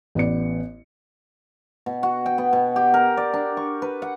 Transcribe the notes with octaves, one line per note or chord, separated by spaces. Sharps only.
A1 B3 D5 C#7
B2
F#4
G5
B3
B2
G4
A#4
D5
D4
C#6
B4
F#5